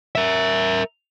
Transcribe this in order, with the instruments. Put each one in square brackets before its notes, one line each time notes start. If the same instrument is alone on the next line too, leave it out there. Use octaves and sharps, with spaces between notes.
[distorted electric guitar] A#4 E5